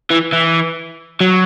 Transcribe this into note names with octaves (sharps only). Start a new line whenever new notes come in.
E3
E3
F#3